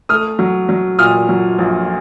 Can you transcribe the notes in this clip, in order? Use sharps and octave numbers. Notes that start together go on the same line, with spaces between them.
A3 D#6 F6
F#3
F#3
A#2 D#6 F6
F#3
A#1